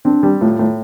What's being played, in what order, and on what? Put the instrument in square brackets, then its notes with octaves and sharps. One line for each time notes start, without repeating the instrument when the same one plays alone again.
[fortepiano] C4 [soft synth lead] D4
[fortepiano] G3
[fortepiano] A2 [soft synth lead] F4
[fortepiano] A2